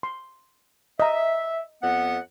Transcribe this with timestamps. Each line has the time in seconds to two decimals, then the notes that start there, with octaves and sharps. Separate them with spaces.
0.03 C6
1.00 D#5 E5 A#5
1.82 F2 B3 F#5